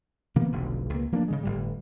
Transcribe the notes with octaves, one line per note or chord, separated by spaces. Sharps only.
C3 E3 A#3 B3
F1 B1 D3
C#2 A#3
F3 A#3 C#4 D4
C#3 E3 G#3
G1 A2 G3